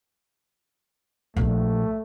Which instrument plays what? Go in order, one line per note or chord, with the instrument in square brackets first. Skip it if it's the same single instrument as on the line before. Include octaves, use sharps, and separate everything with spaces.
[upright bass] A#1 [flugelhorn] A3